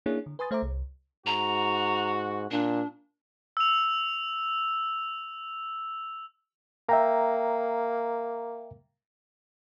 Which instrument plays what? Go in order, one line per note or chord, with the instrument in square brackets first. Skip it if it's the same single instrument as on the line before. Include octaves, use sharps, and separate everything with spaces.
[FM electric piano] A#3 C#4 D4 E4 G#4 C#5
D3
B4 G#5 C6 D#6 A6
A3 C5 E5 A#5 D6
C2
[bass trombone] G#2 [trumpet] F#4 [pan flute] A#5
[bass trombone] A#2 [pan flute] D4
[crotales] E6 F7
[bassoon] A#3 [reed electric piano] E5 G5 A#5